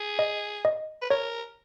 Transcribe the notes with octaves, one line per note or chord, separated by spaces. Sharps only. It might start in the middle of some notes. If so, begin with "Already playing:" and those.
Already playing: G#4
D#5
D#5
B4
A#4 C#5